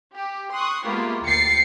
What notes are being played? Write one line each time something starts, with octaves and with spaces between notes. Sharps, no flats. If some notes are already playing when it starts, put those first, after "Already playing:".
G4
C6 C#6 D#6 F#6
G#3 A#3 B3 E4 F4 G4
D2 G5 A6 C7 C#7